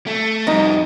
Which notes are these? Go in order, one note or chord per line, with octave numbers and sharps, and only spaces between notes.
A3
F2 G3 D#4 D#5